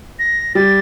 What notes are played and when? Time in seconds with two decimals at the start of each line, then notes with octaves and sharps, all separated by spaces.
0.19 A#6
0.55 G3 G4 A6